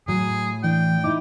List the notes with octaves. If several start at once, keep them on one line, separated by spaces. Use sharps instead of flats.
A2 F#3 G#4
E3 D4 G5
D#4 E4 D6